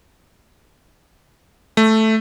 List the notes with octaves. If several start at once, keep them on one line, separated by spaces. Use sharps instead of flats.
A3